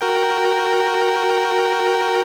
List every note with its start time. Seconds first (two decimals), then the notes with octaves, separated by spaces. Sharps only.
0.01 F#4 A#4 G5